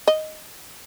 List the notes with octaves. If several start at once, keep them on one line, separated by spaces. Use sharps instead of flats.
D#5